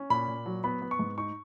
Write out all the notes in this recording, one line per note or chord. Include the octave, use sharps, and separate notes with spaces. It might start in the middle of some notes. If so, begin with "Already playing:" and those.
Already playing: C#4
A#2 B5
A#2
F#3
B3 B5
B3
C#6
G#2
D#4 C#6